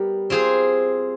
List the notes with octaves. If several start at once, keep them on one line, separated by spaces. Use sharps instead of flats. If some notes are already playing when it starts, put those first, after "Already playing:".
Already playing: G3 B3 G4 A#4
C4 F4 G#4 C5